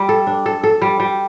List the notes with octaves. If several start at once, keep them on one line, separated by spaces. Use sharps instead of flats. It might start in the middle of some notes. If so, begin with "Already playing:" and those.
Already playing: G3
A4
D4
A4
A4
G3
G3